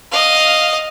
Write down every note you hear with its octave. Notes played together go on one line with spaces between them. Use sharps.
D#5 F5